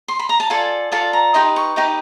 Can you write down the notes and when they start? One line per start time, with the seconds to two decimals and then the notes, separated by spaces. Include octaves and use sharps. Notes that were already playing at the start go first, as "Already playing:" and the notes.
0.08 C6
0.19 B5
0.29 A#5
0.40 A5
0.50 F4 A4 D5 G#5
0.92 F4 A4 D5 A5
1.13 A#5
1.34 D#4 G4 B4 D#5 C6
1.56 C#6
1.76 D#4 G4 B4 D#5 D6